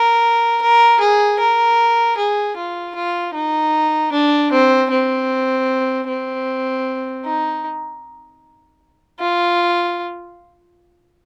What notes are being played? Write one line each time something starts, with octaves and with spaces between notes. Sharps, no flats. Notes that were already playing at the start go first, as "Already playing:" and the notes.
Already playing: A#4
A#4
G#4
A#4
G#4
F4
F4
D#4
D4
C4
C4
C4
D#4
F4